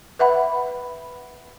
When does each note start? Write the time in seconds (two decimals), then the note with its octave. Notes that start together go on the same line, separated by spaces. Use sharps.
0.19 B4 E5 F#5 B5